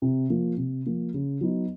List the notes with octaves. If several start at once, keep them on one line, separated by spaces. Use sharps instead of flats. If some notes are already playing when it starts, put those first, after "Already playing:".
C3
F3 A#3
C3
F3 A#3
C#3
F#3 B3 D#4